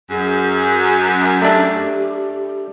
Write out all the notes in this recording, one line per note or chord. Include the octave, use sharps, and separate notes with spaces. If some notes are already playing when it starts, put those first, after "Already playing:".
F#2 G#4
A3 D4 G4